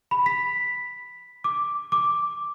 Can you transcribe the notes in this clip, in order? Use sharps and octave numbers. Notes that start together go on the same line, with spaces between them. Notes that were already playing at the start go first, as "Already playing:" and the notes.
B5
B6
D6
D6